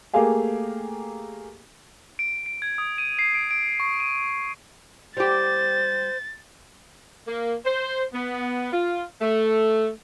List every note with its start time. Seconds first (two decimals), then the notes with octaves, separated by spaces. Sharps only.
0.14 A3 A#3 G4 G#4 F5 G#5
2.19 D7
2.46 D7
2.62 G#6
2.78 D#6
2.98 D#7
3.19 C7
3.34 D7
3.51 D7
3.80 C#6
4.00 D#7
5.17 G3 G4 C5 A6
7.28 A#3
7.65 C5
8.13 B3
8.73 F4
9.21 A3